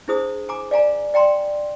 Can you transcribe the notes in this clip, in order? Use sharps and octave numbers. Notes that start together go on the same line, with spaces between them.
D4 E4 G#4 C5 D#6
G#5 A#5 D6
D5 F5 G#5 A#5
D5 G5 A#5 C6